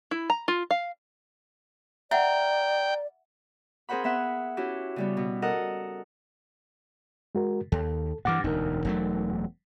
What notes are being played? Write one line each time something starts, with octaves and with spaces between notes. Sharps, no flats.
E4
A#5
F4
F5
A#4 D5 E5 F#5 G5
C4 G#4 A#4 C5 F#5 B5
B3 E5 F#5
C#4 E4 F#4 G4
C#3 G3 B3
B2
A4 A#4 D#5 F#5
G#3 F#4 A#4
D#2 A4
G2 E3 F#5 D6 F6
E1 D2 D#4 A#4
E1 F#3 A3